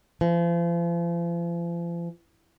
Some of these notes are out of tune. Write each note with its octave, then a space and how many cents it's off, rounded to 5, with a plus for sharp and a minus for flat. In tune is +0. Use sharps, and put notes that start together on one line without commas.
F3 -40